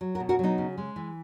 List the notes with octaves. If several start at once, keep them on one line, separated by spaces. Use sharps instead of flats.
F#3
F#4 A#4
B2
F#4 A#4
F#3 B3 D#4
C#3
G#3
E3